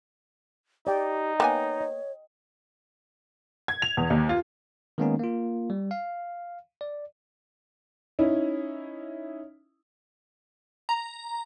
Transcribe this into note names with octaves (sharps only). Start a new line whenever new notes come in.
D#4 G4 D5 G5
A#3 B3 C#5 G5 G#5
D#5
G#6
F7
E2
D#2
F4
D#3 G#3 A#3 B3 C#4 D#4
A#3 F4
G3
F5
D5
C#4 D#4 E4
A#5